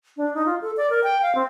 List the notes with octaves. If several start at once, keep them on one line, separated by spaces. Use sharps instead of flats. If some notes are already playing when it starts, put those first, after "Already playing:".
D4
D#4
F4
A4
D5
A#4
G5
F5
C4